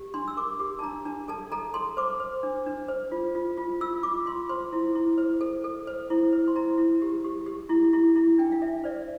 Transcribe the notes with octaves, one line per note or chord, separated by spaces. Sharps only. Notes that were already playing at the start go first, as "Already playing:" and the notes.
Already playing: G4
D4 C6
E6
A#4 D6
G4 D6
A5
D4 A#5
D4 A5
A4 A5
A4 A#5
A4 C6
C5 D6
C5
D4
D4
C5
F4
F4
F4
F4 E6
F4 D6
F4 C6
C5 C6
E4
E4
C5
A4
A4
C5
E4
C5
C6
E4 A#5
E4
G4
G4
G4
E4
E4
E4
D4 G5
F5
D4 E5
C5 D5